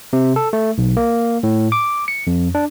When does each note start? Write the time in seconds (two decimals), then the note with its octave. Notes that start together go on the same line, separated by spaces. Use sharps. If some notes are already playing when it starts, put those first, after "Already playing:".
0.13 C3
0.36 A4
0.53 A3
0.78 B1
0.97 A#3
1.43 A2
1.72 D6
2.08 C#7
2.27 F2
2.55 D4